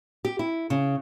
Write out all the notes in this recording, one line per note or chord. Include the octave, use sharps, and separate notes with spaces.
G4
E4
C#3